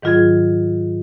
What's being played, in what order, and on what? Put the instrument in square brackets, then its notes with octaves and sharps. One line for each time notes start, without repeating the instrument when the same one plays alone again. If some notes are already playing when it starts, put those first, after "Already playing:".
[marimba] G#2 D#3 F#3 F4 G#4 G#6